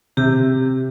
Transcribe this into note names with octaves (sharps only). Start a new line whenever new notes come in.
C3 G4